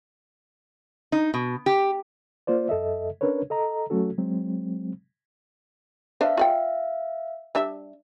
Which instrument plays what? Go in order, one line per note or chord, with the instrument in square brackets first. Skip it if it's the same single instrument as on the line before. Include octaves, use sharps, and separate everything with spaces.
[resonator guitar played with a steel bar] D#4
B2
G4
[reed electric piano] A#3 F4 C5 D5
F#2 A4 D#5 E5
C#4 D4 A#4 B4 C#5
A4 D#5 A#5
F#3 A3 C#4 F#4 A4
F#3 G#3 C4
[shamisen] D4 B4 C5 [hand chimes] E5 F5
[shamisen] F4 D5 G5
G3 D4 E5